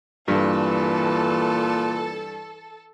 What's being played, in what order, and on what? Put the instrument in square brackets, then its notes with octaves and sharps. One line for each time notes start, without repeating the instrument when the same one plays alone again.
[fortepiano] G2 [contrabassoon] A#2 [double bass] E3 [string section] A4